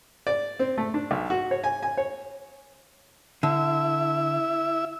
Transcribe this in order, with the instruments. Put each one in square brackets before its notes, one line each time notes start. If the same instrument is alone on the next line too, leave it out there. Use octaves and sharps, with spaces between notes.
[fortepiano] D5
C4
A3
D4
B1
F#4
C#5
G#5
G#5
C#5
[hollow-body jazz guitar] D3 [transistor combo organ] E4 E5